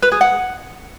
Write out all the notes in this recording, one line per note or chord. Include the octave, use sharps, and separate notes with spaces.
B4
G#4
F#5